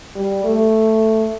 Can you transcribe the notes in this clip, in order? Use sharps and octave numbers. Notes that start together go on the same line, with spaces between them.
G3
A3